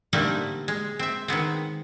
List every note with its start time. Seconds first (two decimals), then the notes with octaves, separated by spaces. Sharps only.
0.13 D3 G3 A3 A#3 C4 D#4
0.68 G#3
0.99 C4 E5
1.28 D#3 G#3 B3 C4